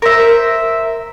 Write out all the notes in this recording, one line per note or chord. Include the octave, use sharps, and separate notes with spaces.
A#4 C5 E5